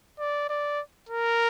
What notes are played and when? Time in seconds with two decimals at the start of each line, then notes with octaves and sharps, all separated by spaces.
0.19 D5
0.49 D5
1.09 A#4